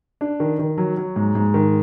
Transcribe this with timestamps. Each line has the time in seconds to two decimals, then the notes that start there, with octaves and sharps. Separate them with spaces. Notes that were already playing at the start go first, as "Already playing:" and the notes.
0.21 D4
0.40 D#3
0.59 D#3
0.78 F#3
0.97 F#3
1.16 G#2
1.35 G#2
1.54 D#3